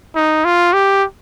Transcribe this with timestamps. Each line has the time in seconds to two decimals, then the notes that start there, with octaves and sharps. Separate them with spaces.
0.15 D#4
0.45 F4
0.73 G4